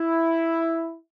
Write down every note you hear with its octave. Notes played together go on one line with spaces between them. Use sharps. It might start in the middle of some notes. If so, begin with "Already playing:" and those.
Already playing: E4